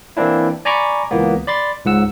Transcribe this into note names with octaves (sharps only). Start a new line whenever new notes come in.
E3 A#3 C4 D4 E4
D5 G#5 A#5 B5 C#6 D6
C#2 E3 A#3 B3
D5 B5 C6 A6
C#2 G#2 F#5 E6